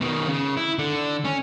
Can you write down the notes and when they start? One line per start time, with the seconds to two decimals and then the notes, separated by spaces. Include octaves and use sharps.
0.01 B2 D#3
0.28 C#3
0.57 E4
0.79 D3
1.25 C#4